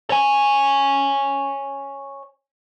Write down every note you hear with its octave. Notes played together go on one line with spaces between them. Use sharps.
C#5 G#5